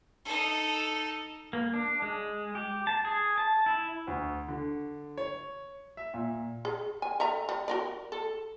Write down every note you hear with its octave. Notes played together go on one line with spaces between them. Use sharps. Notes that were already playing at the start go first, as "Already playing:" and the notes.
D#4 A4
A#3
D4
G#3
G4
A5
G#4
A5
E4
D2
D3
C#5
E5
A#2
G#4
G#5
A4 E5 A#5
G3
F#4 A#4 D5
A4